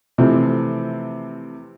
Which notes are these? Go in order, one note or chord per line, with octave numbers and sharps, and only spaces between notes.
C3 E3 F3 A3 C4